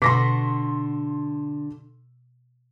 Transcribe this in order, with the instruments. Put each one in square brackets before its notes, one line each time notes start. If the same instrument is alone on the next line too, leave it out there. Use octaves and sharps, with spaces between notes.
[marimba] B2 D6 [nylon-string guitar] D3 F#4 [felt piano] C6 A#6 B6